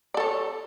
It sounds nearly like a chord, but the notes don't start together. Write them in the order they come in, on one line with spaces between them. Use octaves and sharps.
D5 A4 C#5